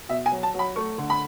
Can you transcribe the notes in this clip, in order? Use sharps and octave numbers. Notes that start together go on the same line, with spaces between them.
B2 E5
G#5
F#3
A5
F#3
B5
A3 C#6
D3
B5